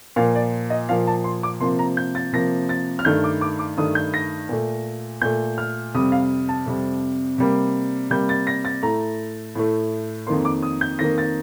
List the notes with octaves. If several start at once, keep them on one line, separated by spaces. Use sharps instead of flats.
A#2 F3 A#3 F5
D5
D#5
A#2 F3 A#3 F5
A5
C6
D6
C3 F3 A#3 C6
A#5
G6
A6
C3 F3 A#3 A#6
A6
F6
G2 D#3 A3 G6
D6
D6
D6
G2 D#3 A3 D#6
G6
A#6
A#2 A3
A#2 A3 G6
F6
F2 C3 G3 D#6
F5
A5
F2 C3 G3
C3 G3 A#3
C3 G3 A#3 G6
A6
A#6
A6
A2 A3 A#5
A2 A3
F2 D#3 A#3 C6
D6
D#6
G6
F2 D#3 A#3 A#6
A6